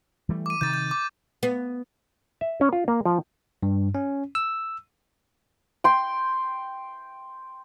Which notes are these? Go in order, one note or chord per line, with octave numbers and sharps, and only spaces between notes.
E3 G3 A3
D6 D#7
C3 D#3 G6 A6
G6
D6
B3
E5
C#4
F4
A#3
F3
G2
C#4
E6
G5 C6